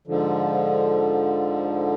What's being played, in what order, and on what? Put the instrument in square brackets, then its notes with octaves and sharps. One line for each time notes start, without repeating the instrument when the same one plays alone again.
[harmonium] G#2 D3 F3